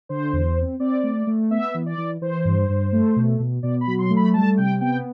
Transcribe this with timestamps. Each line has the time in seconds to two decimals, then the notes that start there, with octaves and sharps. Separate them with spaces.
0.09 D3 C5
0.33 E2
0.57 C4
0.80 C4 D5
1.03 A3
1.27 A3
1.51 B3 E5
1.74 E3
1.86 D5
1.98 E3
2.21 E3 C5
2.45 G2
2.69 G2
2.92 A3
3.16 B2
3.40 B2
3.63 B2 D5
3.81 B5
3.87 F#3
3.99 C6
4.10 A3
4.16 B5
4.33 G3 A5
4.57 C3 G5
4.81 B3 G5